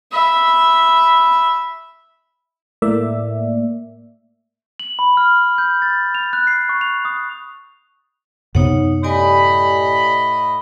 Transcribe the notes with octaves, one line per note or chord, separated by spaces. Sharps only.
E5 B5
A2 A#3 D5 E5
F#7
B5
F6
G6
A6
F7
F#6
C7
C#6
F7
D#6
F#2 C3 B3 D#4 C#5 F#5
A2 G4 D5 D#5 G#5 B5